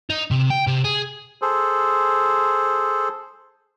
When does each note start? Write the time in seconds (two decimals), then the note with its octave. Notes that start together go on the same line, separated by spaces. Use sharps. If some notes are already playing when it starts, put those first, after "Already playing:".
0.10 D#4
0.31 C3
0.50 G5
0.67 C3
0.85 G#4
1.42 G#4 A4 C5